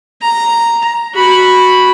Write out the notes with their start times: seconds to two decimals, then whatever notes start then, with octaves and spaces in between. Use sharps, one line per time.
0.22 A#5
1.15 F#4 B5